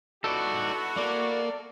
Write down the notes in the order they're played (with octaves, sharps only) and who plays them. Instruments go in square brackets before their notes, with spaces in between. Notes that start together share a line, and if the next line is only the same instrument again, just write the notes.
[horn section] B3 E4 F#4 [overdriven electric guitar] D#4 D5 [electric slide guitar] A4
[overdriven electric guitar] A#3 [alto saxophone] D5